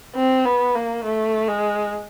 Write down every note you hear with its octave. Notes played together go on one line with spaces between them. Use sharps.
C4
B3
A#3
A3
G#3